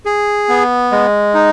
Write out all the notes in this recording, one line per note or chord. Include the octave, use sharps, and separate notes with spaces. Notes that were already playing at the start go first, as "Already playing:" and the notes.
G#4
B3
G#3
D#4